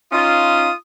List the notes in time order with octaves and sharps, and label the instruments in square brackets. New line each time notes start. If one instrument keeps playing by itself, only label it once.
[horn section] C#4 D#4 F4 [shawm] D#6